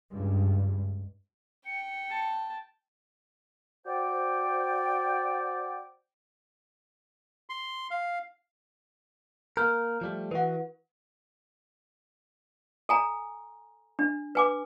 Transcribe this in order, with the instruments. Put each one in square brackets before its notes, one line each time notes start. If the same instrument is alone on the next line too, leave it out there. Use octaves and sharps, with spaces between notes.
[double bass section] C#2 G2
[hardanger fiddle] G5 [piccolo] C#7
[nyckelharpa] A5
[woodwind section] F#4 C5 D5 G5
[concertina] C6
F5
[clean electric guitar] A#3 A#4 [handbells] F6 G6
[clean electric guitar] F3 G3 A3
[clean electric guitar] E3 F#4 [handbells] B4 F#5
[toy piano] A4 G#5 A#5
D4
B4 G#5 D6